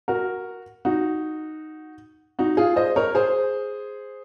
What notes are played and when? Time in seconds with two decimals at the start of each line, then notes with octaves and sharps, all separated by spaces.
0.08 F#4 A#4
0.85 D#4 F#4
2.39 D#4 F#4
2.57 F4 G#4
2.76 C5 D#5
2.96 A#4 C#5
3.15 G#4 C5